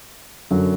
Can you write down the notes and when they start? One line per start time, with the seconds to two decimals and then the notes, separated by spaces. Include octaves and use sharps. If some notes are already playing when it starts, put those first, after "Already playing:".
0.51 F#2 D3 F#3